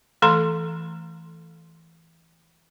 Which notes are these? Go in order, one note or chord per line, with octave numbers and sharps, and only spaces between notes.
E3 A3 A4 A#5 C6